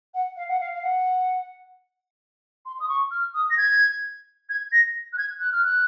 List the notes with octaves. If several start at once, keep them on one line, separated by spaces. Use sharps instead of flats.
F#5
F5
F#5
F5
F5
F#5
C6
D#6
C#6
F6
D#6
A#6
G#6
G#6
A#6
F#6
G#6
F#6
F6
F#6